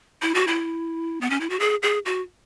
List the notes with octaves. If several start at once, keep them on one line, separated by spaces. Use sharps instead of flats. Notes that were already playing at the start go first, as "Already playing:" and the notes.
E4
F#4
E4
B3
C#4
E4
F#4
G#4
G#4
F#4